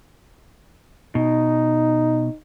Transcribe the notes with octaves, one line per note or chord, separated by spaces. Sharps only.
B2 D#4